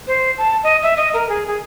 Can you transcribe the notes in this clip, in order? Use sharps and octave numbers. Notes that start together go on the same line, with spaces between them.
C5
A5
D#5
E5
D#5
A#4
G#4
G#4